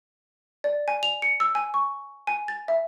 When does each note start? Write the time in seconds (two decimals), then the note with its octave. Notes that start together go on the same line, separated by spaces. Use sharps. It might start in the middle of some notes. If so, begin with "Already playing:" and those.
0.64 D5
0.88 G#5
1.03 F7
1.22 C#7
1.40 E6
1.55 G#5
1.74 C#6
2.27 G#5
2.48 A6
2.68 E5